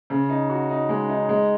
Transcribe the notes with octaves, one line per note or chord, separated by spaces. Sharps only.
C#3
D#4
F#4
D#4
G#3
D#4
G#3